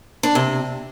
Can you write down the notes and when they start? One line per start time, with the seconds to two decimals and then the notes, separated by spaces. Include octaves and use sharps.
0.23 D4
0.35 C3